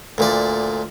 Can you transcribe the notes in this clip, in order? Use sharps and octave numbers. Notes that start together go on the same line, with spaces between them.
D2 A#2 D5